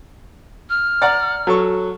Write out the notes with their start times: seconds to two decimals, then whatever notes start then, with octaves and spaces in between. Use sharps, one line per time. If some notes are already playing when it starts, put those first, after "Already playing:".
0.69 F6
1.02 D5 F#5 A#5
1.47 F#3 A4 C#6